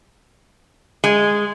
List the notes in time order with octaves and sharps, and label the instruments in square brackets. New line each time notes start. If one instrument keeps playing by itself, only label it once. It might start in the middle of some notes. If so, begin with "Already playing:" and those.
[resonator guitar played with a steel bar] G#3